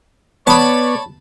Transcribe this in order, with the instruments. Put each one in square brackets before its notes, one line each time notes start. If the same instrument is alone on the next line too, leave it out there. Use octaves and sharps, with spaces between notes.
[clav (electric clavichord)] B3 [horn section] C#5 D5 [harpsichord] A5 B5